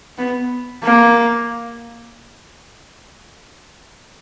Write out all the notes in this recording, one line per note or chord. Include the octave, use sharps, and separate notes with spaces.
B3
A#3